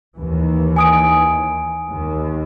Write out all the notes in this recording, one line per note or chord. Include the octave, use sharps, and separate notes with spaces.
D#2 E3
G#5 D#6 D7
D#2